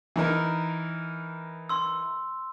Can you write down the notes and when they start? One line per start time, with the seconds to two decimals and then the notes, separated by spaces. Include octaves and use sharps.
0.16 E3 D#4 A#4
1.69 C6 E6